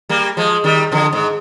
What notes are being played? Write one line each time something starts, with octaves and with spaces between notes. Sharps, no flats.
G3 A#3
F3 G#3
D#3 G3
D3 F3
G#2